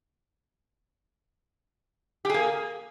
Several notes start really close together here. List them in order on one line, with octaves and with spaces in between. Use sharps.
G4 G#4 A#3